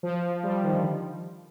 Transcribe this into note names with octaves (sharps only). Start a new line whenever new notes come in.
F3
G3
D#3
D3